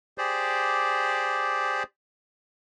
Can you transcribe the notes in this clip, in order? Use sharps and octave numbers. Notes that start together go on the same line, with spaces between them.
G4 G#4 C5 D5